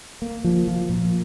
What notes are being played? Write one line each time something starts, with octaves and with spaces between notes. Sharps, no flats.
A#3
F3
F3
A#2